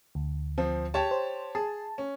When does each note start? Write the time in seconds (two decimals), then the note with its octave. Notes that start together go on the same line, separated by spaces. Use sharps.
0.15 D2
0.58 F3 C4
0.94 G4 C#5 A5
1.11 C5
1.55 G#4 A5
1.98 C#4